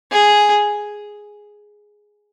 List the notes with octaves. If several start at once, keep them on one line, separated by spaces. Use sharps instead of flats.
G#4